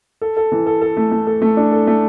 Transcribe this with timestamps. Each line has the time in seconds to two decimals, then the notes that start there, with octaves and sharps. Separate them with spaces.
0.21 A4
0.37 A4
0.52 E3
0.66 A4
0.82 A4
0.97 A3
1.11 A3
1.27 A4
1.42 A3
1.57 D4
1.72 A4
1.87 A3